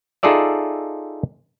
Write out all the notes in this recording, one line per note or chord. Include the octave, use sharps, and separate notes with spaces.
D#4 F4 G#4 A4 D5 E5